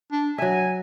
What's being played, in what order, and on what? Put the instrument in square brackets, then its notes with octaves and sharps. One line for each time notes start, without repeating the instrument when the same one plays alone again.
[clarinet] D4
[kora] F#3 E5 [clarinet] G#5